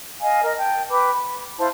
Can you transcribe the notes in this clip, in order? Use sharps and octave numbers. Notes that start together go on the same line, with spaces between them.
D#5 F5 G#5
A#4 D#5
G5 A5
B4 G5 B5 D6
B5
E4 C5 F5 A5